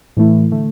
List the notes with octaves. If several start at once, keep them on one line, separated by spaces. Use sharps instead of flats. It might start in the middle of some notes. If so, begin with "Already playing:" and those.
A2 E3 A3 E4
D3 A3